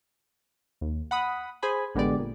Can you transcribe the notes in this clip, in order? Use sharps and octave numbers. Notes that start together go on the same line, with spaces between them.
D#2
F#5 B5 D#6
G#4 C5 G#5 B5
A1 D3 G#3 B3 G4 D5
A#2